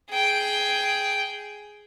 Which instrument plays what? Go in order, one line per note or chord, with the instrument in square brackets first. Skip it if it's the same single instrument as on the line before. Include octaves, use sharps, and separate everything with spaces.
[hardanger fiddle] G#4 G5